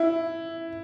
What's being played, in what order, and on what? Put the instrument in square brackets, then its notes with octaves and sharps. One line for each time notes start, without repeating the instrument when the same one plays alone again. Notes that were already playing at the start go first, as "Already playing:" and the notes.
Already playing: [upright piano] E4